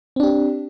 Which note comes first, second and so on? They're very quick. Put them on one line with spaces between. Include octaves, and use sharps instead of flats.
C4 D4 G4